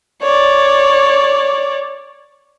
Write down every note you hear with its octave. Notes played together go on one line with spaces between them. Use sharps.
C#5 D5